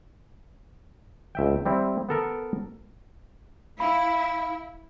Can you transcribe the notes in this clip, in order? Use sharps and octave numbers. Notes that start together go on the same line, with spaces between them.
C#2 E5 G5
G3 C4 E4
B3 A4 A#4
E4 F5 B5